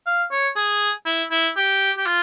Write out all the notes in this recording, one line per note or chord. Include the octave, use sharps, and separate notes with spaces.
F5
C#5
G#4
E4
E4
G4
G4
F4